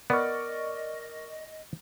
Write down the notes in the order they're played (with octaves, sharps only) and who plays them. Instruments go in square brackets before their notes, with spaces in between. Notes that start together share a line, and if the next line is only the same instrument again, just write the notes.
[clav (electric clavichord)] B3 [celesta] A#4 F6 [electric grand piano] D5 C#6 [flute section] D#5